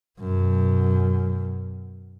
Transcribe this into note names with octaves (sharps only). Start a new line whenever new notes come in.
F#2 B2